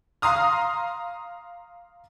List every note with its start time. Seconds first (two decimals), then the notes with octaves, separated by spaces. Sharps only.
0.22 F5 A#5 C6 D#6 F6